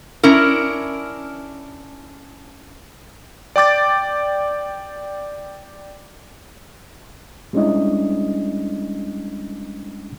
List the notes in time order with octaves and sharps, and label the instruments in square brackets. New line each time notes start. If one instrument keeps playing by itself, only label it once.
[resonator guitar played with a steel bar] C#4 D4 E4 A#4
[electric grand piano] D5 G5 D6 A6
[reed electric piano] G3 G#3 C#4 D4 E4 D#5